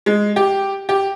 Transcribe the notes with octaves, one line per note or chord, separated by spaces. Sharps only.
G#3
G4
G4